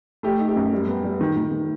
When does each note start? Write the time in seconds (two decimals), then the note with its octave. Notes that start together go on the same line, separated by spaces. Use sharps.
0.23 A3 G4
0.39 D#4
0.48 G4
0.56 F#2
0.73 G3
0.87 B3
1.04 G3
1.21 D#3
1.36 D#3
1.52 D#3